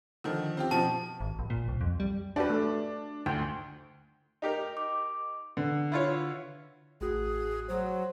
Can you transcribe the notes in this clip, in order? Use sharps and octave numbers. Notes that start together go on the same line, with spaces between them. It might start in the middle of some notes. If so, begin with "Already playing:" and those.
D3 D#3 F3
C4 F4 G4
B2 F3 A5
G#1
A#1
A#2
C2
F2
G3
D4 F#4 G4 B4
A3
D2 G5
D#4 G4 A#4
D6
D3 B4
E4 F4 C#5
A1 F#4 G#4 F#6
F#3 C5